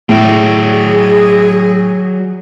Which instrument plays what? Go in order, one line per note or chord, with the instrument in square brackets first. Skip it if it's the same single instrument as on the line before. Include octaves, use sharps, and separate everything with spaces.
[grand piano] A2 [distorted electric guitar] F#3 D5 [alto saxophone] G#4